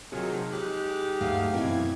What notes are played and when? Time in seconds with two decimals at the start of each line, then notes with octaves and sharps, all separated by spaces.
0.12 C3 D#3 F3 F#3 D#4 G#4
0.52 G#3 D#4 G4 F#6
1.21 D2 G2 A3 F#4 F5
1.54 F#2 B2 E3 C4 E4 G#6